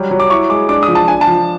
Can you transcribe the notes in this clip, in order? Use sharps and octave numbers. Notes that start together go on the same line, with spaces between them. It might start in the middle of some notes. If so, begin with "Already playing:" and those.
Already playing: F#3 G3
F#3
D6
E4 C#6
G#3 D6
D4 D6
D#6
F3
A5
D4 G#5
A5
F3